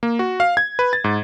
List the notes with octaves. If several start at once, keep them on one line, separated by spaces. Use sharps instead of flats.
A#3
F#4
F5
G#6
B4
A6
G#2